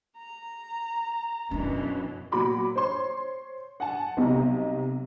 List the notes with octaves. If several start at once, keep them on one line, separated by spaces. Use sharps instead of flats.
A#5
F#2 B2 E3 C#4 D4
A#2 F#3 B5 D6
C5 C#5 C6
F#5 G#5 A5
B1 C3 G3 D#5 A#5